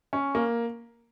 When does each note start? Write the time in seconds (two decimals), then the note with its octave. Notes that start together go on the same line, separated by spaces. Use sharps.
0.13 C#4
0.35 A#3